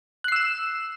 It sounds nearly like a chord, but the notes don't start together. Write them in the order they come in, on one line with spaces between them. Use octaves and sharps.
F#6 C7 E6 E7